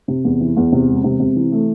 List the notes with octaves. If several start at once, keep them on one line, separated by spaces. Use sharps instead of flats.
C3
E2
E3
E2
C3
E1
C3
C3
E3
A3